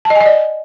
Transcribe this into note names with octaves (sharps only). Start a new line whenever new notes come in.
A5
D#5
G#5
D#5
D5